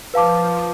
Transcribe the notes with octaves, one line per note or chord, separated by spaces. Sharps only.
F3 B4 F5 A5 D6